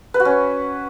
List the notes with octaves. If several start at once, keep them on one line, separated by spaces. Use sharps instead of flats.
B4
F#4
C#4